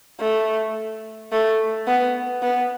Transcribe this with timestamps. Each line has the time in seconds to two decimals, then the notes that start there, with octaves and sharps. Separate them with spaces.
0.20 A3
1.32 A3
1.87 B3
2.43 B3